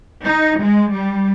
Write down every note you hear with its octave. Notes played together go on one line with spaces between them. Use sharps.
D#4
G#3
G3